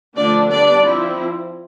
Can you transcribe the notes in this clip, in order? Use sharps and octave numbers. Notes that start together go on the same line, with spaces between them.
D3 F3 A3 D4 D5
G3 B3 D4 D5
F3 C4 E4